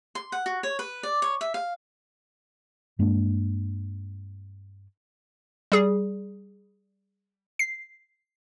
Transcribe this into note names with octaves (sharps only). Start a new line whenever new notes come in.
C6
F#5
F#4
C#5
B4
D5
C#5
E5
F5
G2 G#3 A#3 D4
G3 G#4
C7